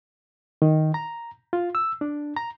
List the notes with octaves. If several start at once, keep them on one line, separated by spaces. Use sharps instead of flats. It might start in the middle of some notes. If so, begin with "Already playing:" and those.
D#3
A#5
F4
E6
D4
A#5